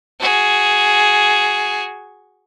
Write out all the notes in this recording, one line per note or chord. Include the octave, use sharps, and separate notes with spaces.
F#4 G#4